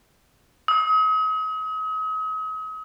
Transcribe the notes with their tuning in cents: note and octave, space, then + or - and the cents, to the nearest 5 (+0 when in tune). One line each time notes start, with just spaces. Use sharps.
D#6 +40